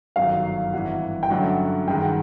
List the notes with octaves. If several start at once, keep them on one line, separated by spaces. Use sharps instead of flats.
G1 F#2 D#3 F#3 F5
G#1 G2 E3 F#5
G5
G2 D3 F#3 A3 C#4 F#5
G2 D#3 G#3 G5
F#5